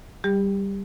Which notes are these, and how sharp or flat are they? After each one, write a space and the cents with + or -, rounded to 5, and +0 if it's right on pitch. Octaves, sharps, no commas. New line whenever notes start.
G3 +0 G4 +25